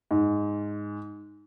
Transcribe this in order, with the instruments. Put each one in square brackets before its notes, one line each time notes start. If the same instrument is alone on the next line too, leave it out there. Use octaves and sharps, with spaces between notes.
[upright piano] G#2